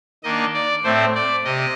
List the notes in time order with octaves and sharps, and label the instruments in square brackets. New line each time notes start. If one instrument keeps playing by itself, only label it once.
[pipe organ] D#3 A#3 D4 D#5
D5
A2 A3 C4 C5
D5
C3 D#5